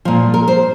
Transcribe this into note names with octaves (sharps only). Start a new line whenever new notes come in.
A#2 F3
A#4
C5